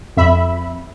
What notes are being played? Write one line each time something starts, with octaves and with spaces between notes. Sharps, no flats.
F2 E5 B5